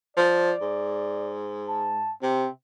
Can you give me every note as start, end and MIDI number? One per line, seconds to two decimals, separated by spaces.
0.17 0.52 53
0.17 1.35 74
0.61 2.14 44
1.68 2.12 81
2.22 2.46 48
2.22 2.49 60